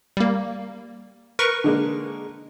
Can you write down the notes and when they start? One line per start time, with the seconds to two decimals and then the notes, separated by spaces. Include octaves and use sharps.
0.17 G3 A#3
1.39 A#4 B4 C#6
1.64 D3 G#3 A#3